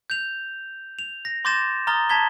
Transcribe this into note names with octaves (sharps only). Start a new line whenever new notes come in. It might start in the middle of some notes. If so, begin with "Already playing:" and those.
G6 F7
F7
A#6
C6 D6 G6 A6 A#6 E7
A#5 D#6 F6 A6 G7
A5 A#5 G#6 B6 G7